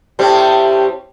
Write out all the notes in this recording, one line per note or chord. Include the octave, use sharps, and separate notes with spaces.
A2 G3 C4